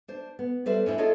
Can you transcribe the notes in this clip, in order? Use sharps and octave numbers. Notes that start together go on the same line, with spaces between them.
D4 C5
B3
G3 A4 B4 C5 D5 E5
C#4 D4 E4 C5
E4 F4 G#4 A4 C#5 D#5